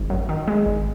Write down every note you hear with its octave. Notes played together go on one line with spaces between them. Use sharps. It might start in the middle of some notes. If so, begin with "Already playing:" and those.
Already playing: G#1
F#2
D#3
G#3
G#1